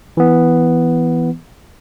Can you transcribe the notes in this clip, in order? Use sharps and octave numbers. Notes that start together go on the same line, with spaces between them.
E3 B3